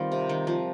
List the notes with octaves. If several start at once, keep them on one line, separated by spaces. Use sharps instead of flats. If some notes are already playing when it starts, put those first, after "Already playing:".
Already playing: D#3 G3 C4 F4 A#4
C3
D#3
F3